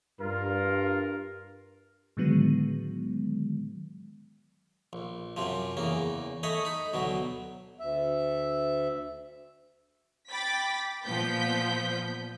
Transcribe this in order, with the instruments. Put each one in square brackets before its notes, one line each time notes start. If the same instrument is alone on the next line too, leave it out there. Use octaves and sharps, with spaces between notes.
[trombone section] G2 [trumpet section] F4 A#4
[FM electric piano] A2 D3 D#3 F#3 G#3 B3
[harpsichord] A#1
F#2 C3 F3
E2 C#3 A#3
A3 C#5 D#5 B5
D#4 B5
D2 B2 F#3
[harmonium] D2 E5
[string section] G5 B5 D6 A6 B6
A#2 F3 B3 G6 B6